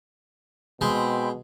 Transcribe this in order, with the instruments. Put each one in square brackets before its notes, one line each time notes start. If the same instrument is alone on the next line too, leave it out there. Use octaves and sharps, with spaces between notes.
[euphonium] B2 [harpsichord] G#3 [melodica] C4 G5 B5